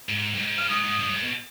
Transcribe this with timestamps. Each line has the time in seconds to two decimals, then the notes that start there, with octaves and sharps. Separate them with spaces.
0.09 G#2
0.34 G2
0.39 G#2
0.58 G2 F6
0.69 G#2 D#6
0.84 G#2
0.99 G2
1.10 G2
1.14 G#2
1.23 B2